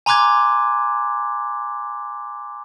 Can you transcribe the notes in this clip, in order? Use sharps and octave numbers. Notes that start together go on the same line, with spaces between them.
G#5 A#5 C6 D6 F#6 G#6